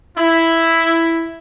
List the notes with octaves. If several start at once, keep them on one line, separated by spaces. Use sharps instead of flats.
E4